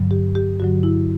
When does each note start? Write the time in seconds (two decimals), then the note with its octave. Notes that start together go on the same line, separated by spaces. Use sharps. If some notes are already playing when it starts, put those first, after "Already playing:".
Already playing: G2 D3 F#3
0.11 G4
0.35 G4
0.60 G2 D3 F#3 F#4
0.83 E4